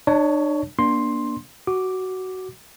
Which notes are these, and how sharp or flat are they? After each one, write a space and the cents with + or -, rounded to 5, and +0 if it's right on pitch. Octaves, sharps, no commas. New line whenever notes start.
D4 +45 C#5 +15 A5 +0
A#3 +30 D4 +0 C6 +5
F#4 +15 D6 +0